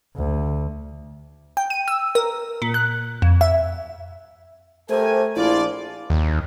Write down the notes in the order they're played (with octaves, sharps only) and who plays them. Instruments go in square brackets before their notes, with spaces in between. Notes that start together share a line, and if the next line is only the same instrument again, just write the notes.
[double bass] D2
[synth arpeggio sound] G5
D#7
E6
A#4
A#2
F#6
F2
E5
[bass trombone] A3 [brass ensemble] G4 A#4 G#5 [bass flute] C5
[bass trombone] A#1 [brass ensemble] F3 F4 D5 [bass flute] E4
[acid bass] D#2